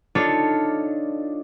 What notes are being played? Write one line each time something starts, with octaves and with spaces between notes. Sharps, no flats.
D4 D#4 F4 A4 C#5